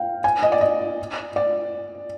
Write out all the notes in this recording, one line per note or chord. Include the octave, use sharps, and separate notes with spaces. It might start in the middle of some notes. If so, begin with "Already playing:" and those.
Already playing: F5 G5
G#5
D#5
D5
D#5
D5